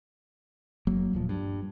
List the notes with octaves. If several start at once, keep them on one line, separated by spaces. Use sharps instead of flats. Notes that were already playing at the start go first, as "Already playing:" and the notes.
F#1 F#3 A#3
D1 A#2 F3
G2